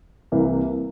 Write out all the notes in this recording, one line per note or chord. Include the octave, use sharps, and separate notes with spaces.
C2 C3 E3 A#3